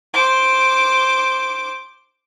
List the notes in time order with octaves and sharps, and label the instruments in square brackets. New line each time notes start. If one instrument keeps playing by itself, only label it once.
[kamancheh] C5 D6